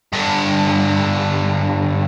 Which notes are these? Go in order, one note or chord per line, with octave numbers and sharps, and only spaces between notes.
G2 D3